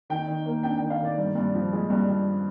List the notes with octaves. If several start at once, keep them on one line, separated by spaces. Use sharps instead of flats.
D#3 G5
D#3
A#3
D4 G5
G5
D#3
F5
D#3 D5
G2
G2
F3
G#3
G2
G2